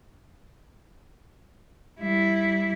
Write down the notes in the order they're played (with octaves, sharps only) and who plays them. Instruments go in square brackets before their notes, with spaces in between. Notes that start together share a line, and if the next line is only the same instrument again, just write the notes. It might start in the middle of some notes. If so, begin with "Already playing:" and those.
[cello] G3 E4